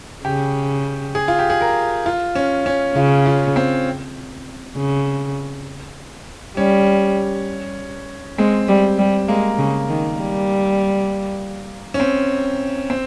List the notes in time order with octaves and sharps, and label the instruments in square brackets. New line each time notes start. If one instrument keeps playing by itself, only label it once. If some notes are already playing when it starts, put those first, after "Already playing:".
[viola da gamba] C#3 [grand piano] G4
[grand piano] G#4
F4
G4
G#4
A#4
F4
C#4
C#4
[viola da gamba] C#3 [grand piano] F4
[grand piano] F4
C4
[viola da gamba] C#3
[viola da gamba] G3 [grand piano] C#4
[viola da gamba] G#3 [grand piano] C4
[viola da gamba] G3
G3
[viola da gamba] G#3 [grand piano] A#3
[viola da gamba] C#3
D#3
G3
[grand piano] C#4
C4
C4